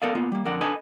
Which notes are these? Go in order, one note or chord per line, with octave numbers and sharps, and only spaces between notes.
B3 A4 A#4 D5 D#5 F5
A#3 B3 F4
G3 A#3
F2 D3 A#4 D5 F#5
D4 A4 B4 D#5 G#5